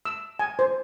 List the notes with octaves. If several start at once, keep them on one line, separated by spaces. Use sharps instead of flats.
E6
G#5
C5